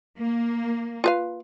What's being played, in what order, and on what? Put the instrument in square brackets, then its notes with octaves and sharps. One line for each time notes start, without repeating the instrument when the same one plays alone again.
[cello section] A#3
[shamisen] F4 B4 F5